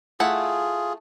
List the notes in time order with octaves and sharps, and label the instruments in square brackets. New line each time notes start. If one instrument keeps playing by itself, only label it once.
[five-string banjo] A3 E4 F#5 [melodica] F4 G#4